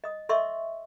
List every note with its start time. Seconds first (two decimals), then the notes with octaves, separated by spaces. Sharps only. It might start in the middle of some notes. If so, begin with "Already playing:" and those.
0.04 D#5 D#6
0.29 A4 D#5 E5 C6 C#6 E6